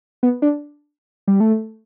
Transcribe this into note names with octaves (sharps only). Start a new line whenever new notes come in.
B3
D4
G3
A3